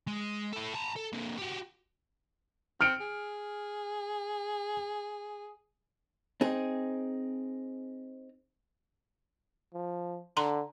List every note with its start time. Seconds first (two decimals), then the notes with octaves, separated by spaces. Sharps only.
0.07 G#3
0.53 E4 A4
0.74 A5 A#5
0.96 A4
1.12 A#2 D3
1.37 F#4 G4
2.81 C4 F6 C#7 D7
3.00 G#4
6.41 C4 D#4 G#4
9.74 F3
10.37 D3 A#5 C6